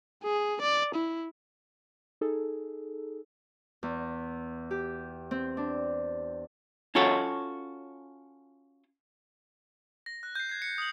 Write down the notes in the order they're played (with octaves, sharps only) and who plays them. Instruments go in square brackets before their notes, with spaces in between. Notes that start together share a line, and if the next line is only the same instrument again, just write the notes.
[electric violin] G#4
D5
E4
[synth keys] D#4 G#4 A4
[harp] E2
G4
C4
D4
[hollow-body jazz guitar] C#4 F4 F#4 A4 C#5
[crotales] A#6
F#6
G6 C7
G#6 C7
C#7
D#6 F#7